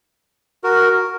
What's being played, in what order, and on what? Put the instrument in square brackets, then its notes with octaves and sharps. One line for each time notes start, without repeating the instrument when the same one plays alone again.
[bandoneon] F#4 A#4